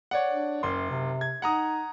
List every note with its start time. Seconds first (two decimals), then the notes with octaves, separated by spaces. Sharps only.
0.11 C#5 D5 F#5
0.28 D4
0.63 F#1 F#2 C6
0.90 C3
1.21 G#6
1.42 D#4 F#5 A#5 D#6